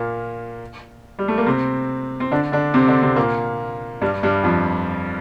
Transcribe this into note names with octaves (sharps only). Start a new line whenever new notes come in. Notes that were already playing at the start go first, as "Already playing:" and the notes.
Already playing: A#2 A#3
G3
A3
A#3
C3 C4
C4
D3 D4
D3 D4
C3 C4
D3 D4
C3 C4
A#2 A#3
G2 G3
G2 G3
F2 F3